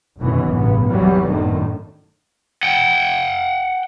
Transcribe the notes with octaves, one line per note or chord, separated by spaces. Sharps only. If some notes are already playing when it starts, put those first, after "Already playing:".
F1 F#2 B2 D#3 E3 B3
A1 G2 C#3 B3
G#1 E2 E3 F#3 G3 B3
F#2 A2 D3 D#3
F#5 G5